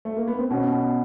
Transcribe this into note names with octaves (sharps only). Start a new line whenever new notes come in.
A3
A#3
B3
C4
B2 C#4
B2